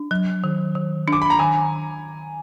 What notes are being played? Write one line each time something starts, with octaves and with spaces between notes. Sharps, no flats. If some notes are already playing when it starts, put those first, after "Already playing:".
Already playing: D4
F#3
D#3
D#3
D4 D6
B5
A#5
D#3 G#5